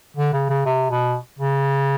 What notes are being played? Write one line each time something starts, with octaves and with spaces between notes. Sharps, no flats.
D3
C#3
C#3
C3
B2
C#3